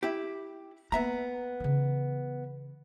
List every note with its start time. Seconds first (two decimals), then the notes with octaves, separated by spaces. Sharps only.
0.03 E4 G4
0.92 A#3 B3 E5 A#5
1.60 C#3 E3